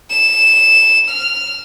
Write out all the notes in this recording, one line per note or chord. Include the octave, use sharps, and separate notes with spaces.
E7
F6